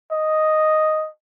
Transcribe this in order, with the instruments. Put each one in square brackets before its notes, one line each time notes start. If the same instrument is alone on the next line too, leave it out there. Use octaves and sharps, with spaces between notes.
[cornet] D#5